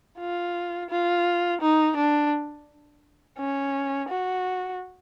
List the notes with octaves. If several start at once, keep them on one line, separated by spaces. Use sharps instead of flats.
F4
F4
D#4
D4
C#4
F#4